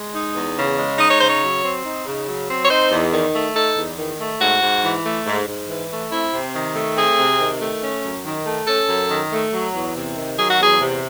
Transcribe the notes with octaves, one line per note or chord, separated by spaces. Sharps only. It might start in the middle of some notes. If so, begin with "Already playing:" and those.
Already playing: G#3
D#4
E2
C#3
G#3
D#4 D#5
C#5
C#3 C5
C#5
F#3
C4
D#4
C#3
F#3
C4
C#5
D#4 C5
E2
D#3
A3
D#4 A4
E2
D#3
A3
G#2 F#4
G#2
E3
A3
G#2
G#2
E3
A3
C4 E4
C3
D#3
A3
C4 G#4
C3
D#3
A3
C#4
F#2
D#3
A3
C#4 A4
F#2
D#3
A3
F#3
E2
C3
D#3
F#3 G#4
F#4
E2 G#4
C3